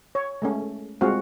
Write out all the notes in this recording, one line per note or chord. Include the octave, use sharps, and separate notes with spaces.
C#5
G#3 A3 C#4
G3 G#3 C4 F4 F#4 F5